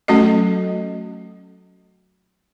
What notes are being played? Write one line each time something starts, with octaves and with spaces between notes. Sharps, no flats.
F#3 A3 C#4 F#4 A4 D#5